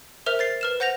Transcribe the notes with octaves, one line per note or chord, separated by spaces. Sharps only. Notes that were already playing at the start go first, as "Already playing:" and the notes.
A#4 C5 E5 F6 F7
C5 A6 C7
B4 F6 E7
C5 F#5 G6 A#6 F7